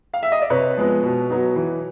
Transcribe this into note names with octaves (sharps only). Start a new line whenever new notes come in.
F5
E5
D#5
D5
C3 B4 C#5
F3 G#3 B3
B2
F#3 B3 D#4
E3